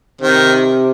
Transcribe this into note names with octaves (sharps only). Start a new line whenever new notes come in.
C3 D#3